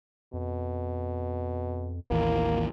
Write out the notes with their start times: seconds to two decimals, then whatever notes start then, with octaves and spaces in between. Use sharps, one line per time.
0.33 F2 B2
2.11 A1 D#2 E3 A#3